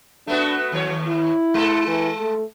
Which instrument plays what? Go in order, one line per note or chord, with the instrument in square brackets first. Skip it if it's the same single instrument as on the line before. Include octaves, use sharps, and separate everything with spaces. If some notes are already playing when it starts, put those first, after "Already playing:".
[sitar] A3 B3 F#4 [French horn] D4
[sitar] D#2 C#5 [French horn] F#3
[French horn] E4
[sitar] G#3 A4
[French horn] E3
A3